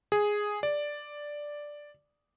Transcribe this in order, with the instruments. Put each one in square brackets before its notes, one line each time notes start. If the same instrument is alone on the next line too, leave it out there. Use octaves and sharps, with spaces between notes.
[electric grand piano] G#4
D5